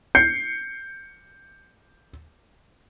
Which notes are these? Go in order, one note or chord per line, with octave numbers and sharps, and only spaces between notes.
G6 C7 C#7